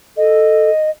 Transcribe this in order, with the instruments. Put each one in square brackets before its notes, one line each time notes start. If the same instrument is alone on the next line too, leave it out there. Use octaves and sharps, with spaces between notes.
[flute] A4 [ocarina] D#5